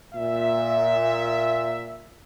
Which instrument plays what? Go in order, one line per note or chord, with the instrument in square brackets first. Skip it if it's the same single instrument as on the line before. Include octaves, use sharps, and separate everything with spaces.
[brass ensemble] A#2 E5